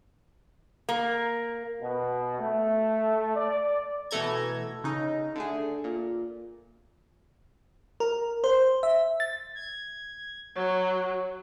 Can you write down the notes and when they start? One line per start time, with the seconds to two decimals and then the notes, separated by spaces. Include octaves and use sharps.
0.89 A#3
1.81 B2
2.39 A3
3.36 D5
4.11 B2 E3 A3 A4 A#5 G#6
4.84 C#3 D#4
5.36 D3 A3 G#4
5.84 A#2
8.00 A#4
8.44 C5
8.83 E5
9.20 A6
9.55 G#6
10.56 F#3 C#5